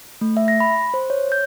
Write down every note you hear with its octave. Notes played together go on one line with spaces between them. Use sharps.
A3
E5
A#6
B5
C5
C#5
G6